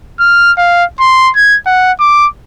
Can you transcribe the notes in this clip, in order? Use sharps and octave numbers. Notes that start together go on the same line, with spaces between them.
F6
F5
C6
G#6
F#5
D6